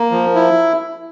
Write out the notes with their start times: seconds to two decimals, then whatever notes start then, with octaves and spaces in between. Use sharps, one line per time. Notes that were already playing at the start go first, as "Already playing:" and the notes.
Already playing: A#3 A#4
0.11 F3
0.35 E4